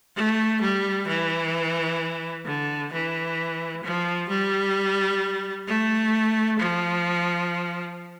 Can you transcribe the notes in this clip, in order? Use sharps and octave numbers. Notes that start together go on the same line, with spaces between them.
A3
G3
E3
D3
E3
F3
G3
A3
F3